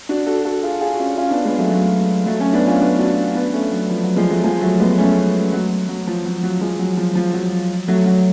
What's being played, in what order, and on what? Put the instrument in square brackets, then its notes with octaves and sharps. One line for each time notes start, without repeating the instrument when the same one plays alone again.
[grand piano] D4 F#4
F#4 A4
F#4 A4
F4 G#4
F4 G#4
F#4
C#4 F4
C#4 F4
B3 D4
G#3 B3
F#3 A3
F#3
F#3 A3
A3 C#4
B3 D4
C#4 F4
B3 D4
D4 F#4
B3 D4
A3 C#4
F#3
F3
F#3
F3 G#3
F#3 A3
F3 G#3
F#3 A3
G#3 B3
A3 C#4
F#3
F#3
F3
F#3
F#3
F3 G#3
F#3
F3
F3
F#3
F#3 A3
F#3